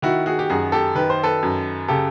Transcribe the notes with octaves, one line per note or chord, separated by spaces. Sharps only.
D#3 E4 F#4
F#4 G#4
G4
F#2 F#4 G#4
G4 A4
D#3 B4
C5
A4 B4
F#2
C#3 G4 A4